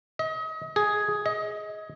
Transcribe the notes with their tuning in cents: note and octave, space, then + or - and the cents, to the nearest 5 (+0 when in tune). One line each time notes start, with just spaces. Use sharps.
D#5 +35
G#4 +5
D#5 +25